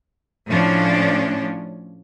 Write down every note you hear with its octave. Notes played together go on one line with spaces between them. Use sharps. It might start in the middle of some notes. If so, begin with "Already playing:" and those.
A2 F3 C#4 D4